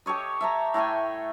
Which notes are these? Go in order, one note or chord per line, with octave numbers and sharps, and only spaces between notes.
G4 A4 C#5 D#5
E5 A5 A#5
A2 A3 G5 G#5